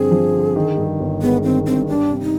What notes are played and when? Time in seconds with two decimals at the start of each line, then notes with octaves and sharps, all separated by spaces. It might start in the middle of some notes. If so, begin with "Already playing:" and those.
Already playing: G2 D3 F3 C4 G#4
0.11 F3
0.33 D3
0.56 D#3
0.78 G2
1.00 G1
1.22 G#3 B3
1.44 D#3 C4
1.66 G2 C4
1.88 G3 D4
2.11 C3
2.21 D#4